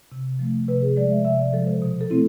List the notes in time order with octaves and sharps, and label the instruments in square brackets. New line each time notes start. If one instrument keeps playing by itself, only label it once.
[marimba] C3
F3 A3
C3 B4
G#4
F3 G#3 D5
E5
C3 E5
D5
F3 G#3 A4
C5
B2
A4
A3 C4 E4